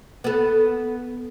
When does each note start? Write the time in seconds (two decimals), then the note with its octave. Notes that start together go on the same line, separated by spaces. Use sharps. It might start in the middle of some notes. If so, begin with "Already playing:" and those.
0.24 B3 A4